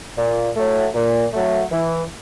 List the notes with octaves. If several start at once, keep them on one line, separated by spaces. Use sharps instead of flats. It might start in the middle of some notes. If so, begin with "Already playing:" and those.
A#2
F#3 A3
A#2
F#3 A3
E3